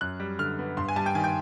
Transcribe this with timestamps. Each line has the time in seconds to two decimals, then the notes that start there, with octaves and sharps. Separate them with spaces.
0.01 F#2 F#6
0.20 G3
0.39 D3 F6
0.59 B3
0.77 G2 C6
0.89 G#5
0.96 G3 A5
1.06 G5
1.15 D#3 G#5
1.24 G5